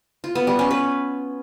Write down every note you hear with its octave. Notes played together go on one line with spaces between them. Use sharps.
F4
B3
G3
C#4
B4